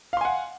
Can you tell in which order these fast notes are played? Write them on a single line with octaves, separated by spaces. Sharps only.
F5 C6 G#5 F#5